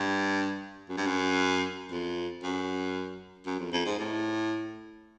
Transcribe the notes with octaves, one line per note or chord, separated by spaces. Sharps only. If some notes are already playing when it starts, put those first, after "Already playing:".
Already playing: G2
F#2
G2
F#2
F2
F#2
F#2
F2
F2
G#2
A2